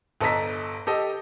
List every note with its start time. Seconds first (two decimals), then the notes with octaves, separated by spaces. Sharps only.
0.21 G1 A4 D#5 A#5 B6
0.87 G4 A4 D#5